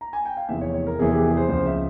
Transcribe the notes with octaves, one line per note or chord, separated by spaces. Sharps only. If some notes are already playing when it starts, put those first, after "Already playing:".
A#5
G#5
G5
F5
F1 E2 E3 E5
C#5
C#5
A#4
F1 E2 E3 G#4
G4
G#4
C5
C#2 C#3 F3 C5
E5